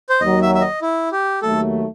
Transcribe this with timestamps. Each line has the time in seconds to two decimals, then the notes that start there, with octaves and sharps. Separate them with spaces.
0.09 C5
0.21 D#2 D#3 F#3 D#5
0.42 E5
0.55 E5
0.61 D#5
0.82 E4
1.12 G4
1.42 D#2 D#3 F#3 A3 A4